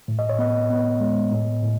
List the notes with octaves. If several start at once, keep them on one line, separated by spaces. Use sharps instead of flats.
A2
D#5
C#5
B3 D#5
B3
G#3
A2
A2